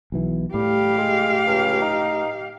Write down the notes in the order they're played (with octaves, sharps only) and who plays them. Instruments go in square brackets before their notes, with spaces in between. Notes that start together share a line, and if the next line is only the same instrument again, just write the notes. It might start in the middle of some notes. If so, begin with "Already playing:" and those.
[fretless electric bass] B1 B2 E3
[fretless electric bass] A2 [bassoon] G3 [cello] G4 F5
[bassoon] G#3
C#2
D#4